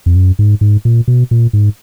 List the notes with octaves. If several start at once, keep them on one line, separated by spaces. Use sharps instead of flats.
F2
F#2
G#2
G#2
A#2
B2
A#2
G#2